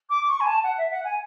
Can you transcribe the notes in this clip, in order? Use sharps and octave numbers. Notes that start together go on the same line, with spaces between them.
D6
C#6
G#5
A5
F#5
E5
F#5
G#5